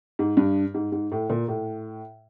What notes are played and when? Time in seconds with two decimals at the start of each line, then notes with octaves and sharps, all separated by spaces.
0.19 G#2
0.37 G2
0.74 G#2
0.92 G#2
1.12 A2
1.30 A#2
1.48 A2